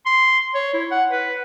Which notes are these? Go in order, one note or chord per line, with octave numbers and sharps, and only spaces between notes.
C6
C#5
E4
F#5
B4